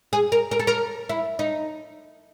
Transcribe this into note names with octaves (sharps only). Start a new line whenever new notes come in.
G#4
A#4
A#4
A4
A#4
E4
D#4